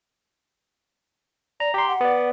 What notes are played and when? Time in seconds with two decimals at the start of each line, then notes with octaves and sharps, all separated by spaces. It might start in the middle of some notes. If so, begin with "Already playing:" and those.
1.60 D5 A#5
1.74 G4 A#5 C6
1.89 F#5
2.01 B3 D5